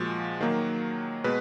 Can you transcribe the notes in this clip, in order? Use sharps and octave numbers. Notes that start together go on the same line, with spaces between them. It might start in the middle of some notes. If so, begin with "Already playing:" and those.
Already playing: A#2 F3 G#3 F#4
D#3 F#3 A#3
B2 G#3 B4